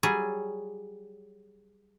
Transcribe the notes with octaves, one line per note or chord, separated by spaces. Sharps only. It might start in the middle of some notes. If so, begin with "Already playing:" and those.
F#3 G3 G#4